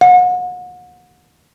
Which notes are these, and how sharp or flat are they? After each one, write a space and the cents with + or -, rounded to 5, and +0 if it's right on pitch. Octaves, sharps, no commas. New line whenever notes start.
F#5 -35